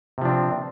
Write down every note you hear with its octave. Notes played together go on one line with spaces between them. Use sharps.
C3 F3 C4 D4